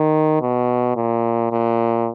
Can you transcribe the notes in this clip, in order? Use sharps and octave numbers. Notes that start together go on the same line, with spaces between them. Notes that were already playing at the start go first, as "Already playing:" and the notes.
Already playing: D#3
B2
A#2
A#2